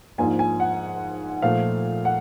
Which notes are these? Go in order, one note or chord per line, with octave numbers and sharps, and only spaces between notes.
G#2 F3 A#3 D4 F4 G#5
G#5
F#5
A#2 F3 A3 F5
F#5